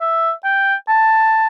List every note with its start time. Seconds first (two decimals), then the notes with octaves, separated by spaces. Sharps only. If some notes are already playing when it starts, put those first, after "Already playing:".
0.01 E5
0.44 G5
0.89 A5